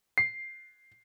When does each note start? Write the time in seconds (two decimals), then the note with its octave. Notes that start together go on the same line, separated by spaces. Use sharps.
0.18 C7